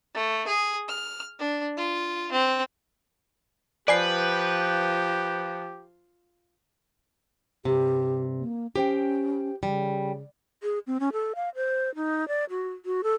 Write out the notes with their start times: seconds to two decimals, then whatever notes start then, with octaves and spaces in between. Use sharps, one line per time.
0.14 A3
0.47 G#4
0.88 F6
1.39 D4
1.77 F4
2.32 C4
3.88 F3 G4 B4 D5 G#5 C7
7.65 G2 C3 G4
8.40 A#3
8.76 C#4 G4 C5 G5
9.63 C#3 G3
10.62 G#4
10.87 C4
11.00 C#4
11.13 A4
11.35 F5
11.55 C5
11.95 D#4
12.28 D5
12.50 F#4
12.85 F#4
13.03 A4